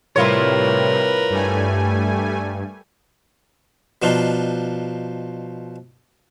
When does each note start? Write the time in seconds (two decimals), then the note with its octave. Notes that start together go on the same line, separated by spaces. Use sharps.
0.16 A2 C3 G3 E4 F4 A#4 B4 C#5
1.31 G2 G3 A3 G#5
4.02 B2 F3 D4 D#4 F4